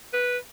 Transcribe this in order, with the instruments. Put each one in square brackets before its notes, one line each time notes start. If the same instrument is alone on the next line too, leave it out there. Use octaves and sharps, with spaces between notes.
[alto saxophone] B4